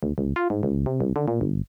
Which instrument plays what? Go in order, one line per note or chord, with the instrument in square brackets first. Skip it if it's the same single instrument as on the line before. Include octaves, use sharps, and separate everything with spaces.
[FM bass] D2
C#2
F4
G#2
C#2
C3
C2
D3
A#2
G1